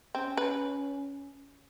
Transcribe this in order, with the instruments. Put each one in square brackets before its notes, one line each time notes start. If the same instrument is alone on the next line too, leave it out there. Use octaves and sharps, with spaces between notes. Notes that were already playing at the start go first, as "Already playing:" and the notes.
[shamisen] C4 [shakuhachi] C#4
[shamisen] B4